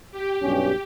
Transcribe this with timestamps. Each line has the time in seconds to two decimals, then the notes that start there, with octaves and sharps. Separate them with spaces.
0.11 G4
0.42 B1 G2 C#4